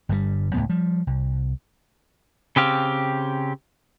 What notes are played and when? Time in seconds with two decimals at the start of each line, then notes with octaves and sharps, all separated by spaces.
0.09 G1 G2 D3 G3
0.54 C#2 F#2 A2 B3
0.70 F3 G3
1.07 C2
2.56 C#3 C4 G4 F5